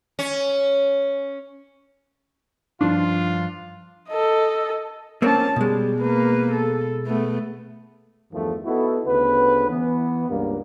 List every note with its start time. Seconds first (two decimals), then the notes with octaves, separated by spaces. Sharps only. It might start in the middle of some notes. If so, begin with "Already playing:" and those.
0.19 C#4
2.81 G2 F3 D4 F4
4.08 A4 D#5
5.22 A#3 C4 C#4 C#5 A5
5.56 B2 G3 G#3
6.02 A#3 B4
6.52 A4
7.07 A3 B3
8.32 E2 G2 D#3 F3 A3
8.65 B3 D#4 E4 F#4 A4
9.06 D2 C#3 B3 B4
9.69 E3 B3
10.29 C#2 G2 A#3